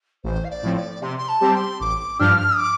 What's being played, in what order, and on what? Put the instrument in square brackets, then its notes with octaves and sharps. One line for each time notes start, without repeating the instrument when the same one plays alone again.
[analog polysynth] A1 [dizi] C5
[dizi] F5
D5
[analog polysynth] A2 F3 C4
[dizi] D5
[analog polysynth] C3 [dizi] C6
[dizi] C6
A5
[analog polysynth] G3 C4 G4
[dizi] C6
[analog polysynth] A1 [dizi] D6
[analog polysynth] G2 F3 D4 G4 [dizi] F6
[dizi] D6